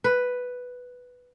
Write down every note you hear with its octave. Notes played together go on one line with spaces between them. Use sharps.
B4